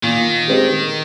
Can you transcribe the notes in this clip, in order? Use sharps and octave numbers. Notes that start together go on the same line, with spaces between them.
A#2 D#3
G#3 C4 G4